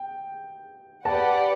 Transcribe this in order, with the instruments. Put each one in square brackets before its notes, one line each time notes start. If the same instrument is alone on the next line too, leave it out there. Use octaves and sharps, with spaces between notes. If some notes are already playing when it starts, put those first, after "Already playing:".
Already playing: [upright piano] G5
[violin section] G4 B4 D5 F#5 [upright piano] A5